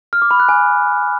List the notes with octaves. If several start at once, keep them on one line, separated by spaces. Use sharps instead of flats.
F6
D6
B5
F#6
G#5